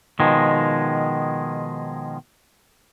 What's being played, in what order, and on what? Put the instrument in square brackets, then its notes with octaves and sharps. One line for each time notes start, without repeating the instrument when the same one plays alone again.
[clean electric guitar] B2 D#3 F3 G#3